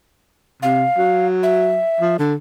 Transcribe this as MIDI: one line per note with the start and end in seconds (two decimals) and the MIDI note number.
0.62 0.86 48
0.62 1.26 77
0.98 1.82 54
1.43 2.17 76
2.01 2.14 53
2.19 2.35 50
2.19 2.34 69